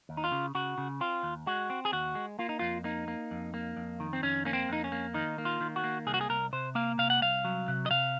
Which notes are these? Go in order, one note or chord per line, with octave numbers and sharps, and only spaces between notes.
D#2
D#4
F4
C#3
C#3 F#4
C#3
C4 F4
D#2
G#3 F#4
C4
G#4
D#2 F#4
G#3
A#3 F4
D#4
F2 F4
A#3 D#4
A#3
F2
A#3
F2
D#3
C4
F2 C#4
A#3 C#4
C4
F2 D#4
C#4
A#3
D#3 D#4
A#3
F4
D#3
F#4
A#3
C2 G#4
F#4
G#4
C2 A#4
C3 C5
A#3 F5
C3 F5
F#5
C2 F5
F#3
C3
D#5
C3 F5